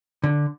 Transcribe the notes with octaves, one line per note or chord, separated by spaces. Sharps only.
D3